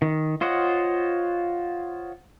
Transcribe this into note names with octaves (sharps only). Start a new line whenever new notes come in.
D#3
F4 C5 C#5 D#5 F#5